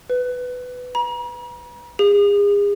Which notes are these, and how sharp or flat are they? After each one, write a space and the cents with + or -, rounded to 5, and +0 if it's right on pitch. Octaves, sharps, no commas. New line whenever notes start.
B4 +15
A#5 +45
G#4 -35